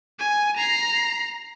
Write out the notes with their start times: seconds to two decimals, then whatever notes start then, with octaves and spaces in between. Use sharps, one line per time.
0.19 G#5
0.57 A#5 C7